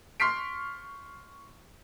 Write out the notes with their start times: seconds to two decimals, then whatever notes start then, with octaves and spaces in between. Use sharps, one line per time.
0.20 C6 C#6 F6 B6 C7 D7